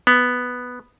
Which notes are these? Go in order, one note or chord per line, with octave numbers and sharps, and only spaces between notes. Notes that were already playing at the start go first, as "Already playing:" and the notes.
B3